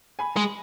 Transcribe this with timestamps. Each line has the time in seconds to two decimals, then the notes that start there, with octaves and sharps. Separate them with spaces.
0.19 G#5 B5
0.37 G#3